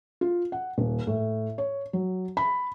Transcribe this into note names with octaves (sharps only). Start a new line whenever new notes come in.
F4
F#5
D#1
A2
C#5
F#3
B5